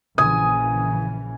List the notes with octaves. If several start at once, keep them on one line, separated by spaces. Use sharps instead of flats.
A#1 C#3 E3 G#5 D#6